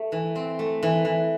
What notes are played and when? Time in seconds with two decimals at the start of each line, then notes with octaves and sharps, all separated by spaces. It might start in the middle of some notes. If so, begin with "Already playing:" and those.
Already playing: A3
0.12 E3
0.36 C4
0.59 A3
0.83 E3
1.05 E3